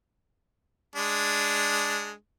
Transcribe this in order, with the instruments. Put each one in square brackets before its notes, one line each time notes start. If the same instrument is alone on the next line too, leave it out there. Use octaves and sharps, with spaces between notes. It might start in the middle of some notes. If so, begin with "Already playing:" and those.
[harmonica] G#3 D4